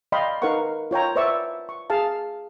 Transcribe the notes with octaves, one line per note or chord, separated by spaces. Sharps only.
D5 D#5 F5 G5 B5 C6
D#4 A#4 B4 F5 F#5 C#6
F4 C#5 G5 A#5
B4 C5 D5 E5 C#6 E6
C#6
G#4 F5 A5